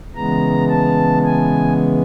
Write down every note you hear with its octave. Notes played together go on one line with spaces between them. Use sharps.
C#3 E3 G#3 B3 A#5
A5
G#5